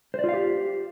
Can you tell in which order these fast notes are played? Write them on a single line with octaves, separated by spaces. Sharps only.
C5 D5 F4 F5 G4